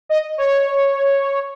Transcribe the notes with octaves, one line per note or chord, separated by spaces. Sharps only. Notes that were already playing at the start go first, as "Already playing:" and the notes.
D#5
C#5